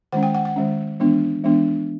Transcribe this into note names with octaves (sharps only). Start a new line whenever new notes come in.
D#3 G#3 C#4 F#5
G5
F#5
F#5
D#3 G#3 C#4
E3 G#3 B3 D4
E3 G#3 B3 D4